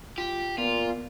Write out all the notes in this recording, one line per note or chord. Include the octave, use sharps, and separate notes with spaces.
F4 G4
A#2 B3 F4